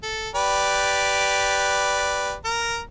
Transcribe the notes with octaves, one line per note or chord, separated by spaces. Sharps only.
A4
G4 B4 D5
A#4 A#5